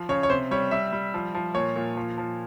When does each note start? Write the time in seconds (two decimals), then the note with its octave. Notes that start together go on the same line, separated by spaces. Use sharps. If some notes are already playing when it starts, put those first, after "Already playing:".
Already playing: F3
0.09 C#3 C#5
0.23 C#5
0.30 C3 C5
0.51 G3 C#5
0.71 G3 E5
0.93 G3
1.14 F3
1.35 F3
1.54 A#2 C#5
1.76 A#2
1.97 F3
2.18 F3